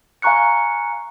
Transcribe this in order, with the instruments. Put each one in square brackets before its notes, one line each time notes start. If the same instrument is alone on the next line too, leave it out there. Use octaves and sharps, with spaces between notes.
[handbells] F5 G#5 A#5 C#6 F#6 C#7